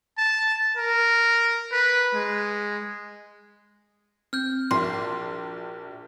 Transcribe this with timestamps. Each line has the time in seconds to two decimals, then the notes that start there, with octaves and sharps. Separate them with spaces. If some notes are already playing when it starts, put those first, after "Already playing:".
0.18 A5
0.77 A#4
1.72 B4
2.14 G#3
4.33 C4 F6 G6
4.71 A#1 F#4 A#4 E5 C6